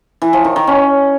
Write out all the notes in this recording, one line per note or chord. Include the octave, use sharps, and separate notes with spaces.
E3
F3
D#3
D#3
C#4